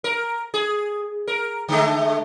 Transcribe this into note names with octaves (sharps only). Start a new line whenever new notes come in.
A#4
G#4
A#4
D3 G#3 A3